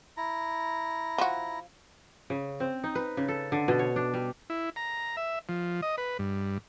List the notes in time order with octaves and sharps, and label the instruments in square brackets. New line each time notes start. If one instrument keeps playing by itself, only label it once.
[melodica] E4 A#5
[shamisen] F3 F#4
[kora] C#3
C4
D#4
B4
C#3
A4
D3
B2
C#5
D4
G3
[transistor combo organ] E4
A#5
E5
F3
D#5
B4
G2